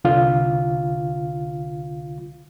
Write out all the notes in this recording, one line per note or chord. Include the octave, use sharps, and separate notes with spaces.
C2 D3 F4 F5